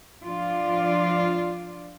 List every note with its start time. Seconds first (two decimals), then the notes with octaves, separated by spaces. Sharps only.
0.24 F3 D4 F4 D5